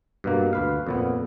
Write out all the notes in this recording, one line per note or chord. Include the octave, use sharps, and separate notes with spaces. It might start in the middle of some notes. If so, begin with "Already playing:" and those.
G2 B2 A#3
D2 B4 F5
F2 A#2 B3